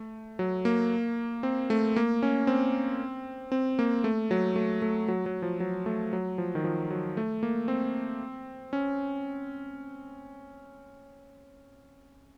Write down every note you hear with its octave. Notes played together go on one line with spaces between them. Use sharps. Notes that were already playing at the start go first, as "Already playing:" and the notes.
Already playing: A3
F#3
A#3
C4
A3
A#3
C#4
C4
C4
A#3
A3
F#3
A3
A3
F#3
F#3
F3
F#3
A3
F#3
F3
D#3
F3
F#3
A3
A#3
C4
C#4